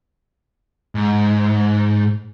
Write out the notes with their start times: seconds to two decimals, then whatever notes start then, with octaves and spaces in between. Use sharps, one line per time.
0.95 G#2